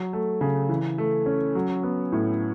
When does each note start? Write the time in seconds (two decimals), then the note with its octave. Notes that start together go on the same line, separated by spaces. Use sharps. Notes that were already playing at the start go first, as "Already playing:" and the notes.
Already playing: F#3
0.13 A3
0.41 C#3
0.69 E3
0.98 A3
1.26 C#4
1.55 F#3
1.83 B3
2.12 A2